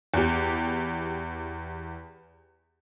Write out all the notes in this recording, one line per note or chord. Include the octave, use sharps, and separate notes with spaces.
E2 G4